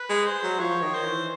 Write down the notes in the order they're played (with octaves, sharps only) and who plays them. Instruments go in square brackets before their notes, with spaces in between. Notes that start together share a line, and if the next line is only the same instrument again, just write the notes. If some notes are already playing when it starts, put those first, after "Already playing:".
Already playing: [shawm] B4
[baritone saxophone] G#3
[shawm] C5
[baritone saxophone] F#3
[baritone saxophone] F3 [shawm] C#5
[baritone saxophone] D#3
[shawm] C5
[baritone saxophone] E3